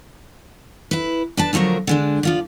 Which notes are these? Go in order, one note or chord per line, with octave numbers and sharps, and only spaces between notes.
E4 B4
D4 B4 A5
D3 F3 F#3 A3 A#4
D3 G#3 D4
F3 F4 D5